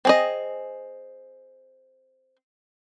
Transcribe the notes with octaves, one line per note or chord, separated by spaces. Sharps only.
C4 G#4 D#5